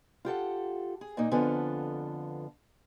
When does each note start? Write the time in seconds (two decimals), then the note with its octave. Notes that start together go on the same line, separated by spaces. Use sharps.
0.25 F4 G4 A4 F#5
1.01 G#4
1.17 A#2 A#3 D#4
1.31 F2 D3 B3 F4 A4 G#5